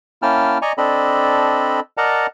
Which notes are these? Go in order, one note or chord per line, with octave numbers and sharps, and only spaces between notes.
A#3 C#4 E4 G5 A5 F6
D5 D#5 G#5 A#5 C#6
C4 D4 A4 D5 D#5 B5
A#4 D5 D#5 F#5 A5 A#5